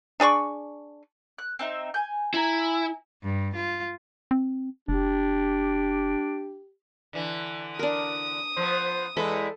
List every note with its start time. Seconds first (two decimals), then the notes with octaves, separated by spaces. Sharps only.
0.20 D4 G#4 D5 C#6
1.39 F#6
1.59 C4 D#4 E5
1.94 G#5 G6
2.34 E4 G#5 A#5
3.23 G2
3.55 F4
4.31 C4
4.88 F1 D4 G4
7.13 D3 E3
7.79 D4 A#4 D#6
8.57 F3 B3 C5
9.17 E2 G#3 E4 A4 B4